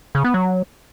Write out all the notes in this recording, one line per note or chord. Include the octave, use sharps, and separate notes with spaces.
C#3
B3
F#3